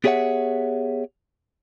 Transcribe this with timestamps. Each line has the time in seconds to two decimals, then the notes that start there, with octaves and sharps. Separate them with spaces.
0.04 B3 G4 G#4 C#5 E5 F#5